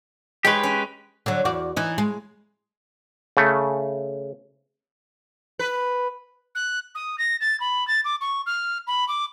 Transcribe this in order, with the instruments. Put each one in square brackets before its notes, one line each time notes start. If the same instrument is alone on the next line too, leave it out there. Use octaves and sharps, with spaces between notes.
[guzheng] G#3 D#4 C#5 [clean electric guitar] G4 B4
[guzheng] C#4
[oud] D3 F#3
E2 F#4 D5
E3 D#4
G#3
[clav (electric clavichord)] C#3 A3
[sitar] B4
[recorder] F#6
D#6
A#6
A6
B5
A6
D6
C#6
F6
B5
D6